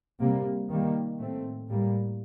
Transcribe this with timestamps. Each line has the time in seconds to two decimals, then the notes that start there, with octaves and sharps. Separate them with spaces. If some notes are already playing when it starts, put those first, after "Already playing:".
0.20 C3 G3 A#3
0.69 D#3 G3 A#3
1.19 A2 A3 C4
1.69 A2 G3 A#3